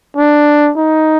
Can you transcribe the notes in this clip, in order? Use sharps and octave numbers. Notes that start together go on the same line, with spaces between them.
D4
D#4